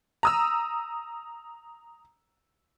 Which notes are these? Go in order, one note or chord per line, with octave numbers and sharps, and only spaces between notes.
A#5 D#6 E6